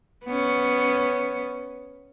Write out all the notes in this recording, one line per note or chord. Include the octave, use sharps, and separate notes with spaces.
B3 C#4